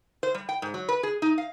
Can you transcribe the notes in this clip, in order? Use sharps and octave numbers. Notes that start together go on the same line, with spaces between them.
C5
G3
G5
G#2
F#3
B4
G#4
D#4
F5